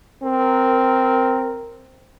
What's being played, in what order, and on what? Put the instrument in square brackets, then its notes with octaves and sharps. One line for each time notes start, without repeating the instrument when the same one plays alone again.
[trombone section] C4 A#4